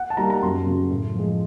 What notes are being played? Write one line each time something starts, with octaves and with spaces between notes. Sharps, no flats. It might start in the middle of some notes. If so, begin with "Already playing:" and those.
Already playing: F#5
A5
G3 A#3 D#4 A#5
A#5
F#2 C6
C#3 F#3
A2
F3 G#3